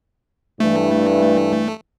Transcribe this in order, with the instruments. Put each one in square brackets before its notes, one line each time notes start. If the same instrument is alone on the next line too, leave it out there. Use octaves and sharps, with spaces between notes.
[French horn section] G2 E3 [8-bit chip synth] A3